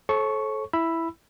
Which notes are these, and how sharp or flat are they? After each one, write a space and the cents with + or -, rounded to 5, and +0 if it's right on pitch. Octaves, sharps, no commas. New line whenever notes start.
A4 -25 C#5 -45 C#6 +0
E4 +0 B5 +0 E6 +10